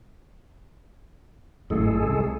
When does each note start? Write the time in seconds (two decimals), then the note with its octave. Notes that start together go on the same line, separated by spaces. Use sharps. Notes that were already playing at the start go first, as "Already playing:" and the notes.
1.70 G#1 F#2 A2 G#3 G#4 A4
2.07 C2